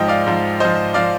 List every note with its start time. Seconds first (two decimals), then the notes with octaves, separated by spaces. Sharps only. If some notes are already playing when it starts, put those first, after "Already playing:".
Already playing: G#2 F3 D#5 G5
0.08 D5 F5
0.27 G#2 F3
0.60 G#2 F3 C5 D#5
0.94 F3 D5 F5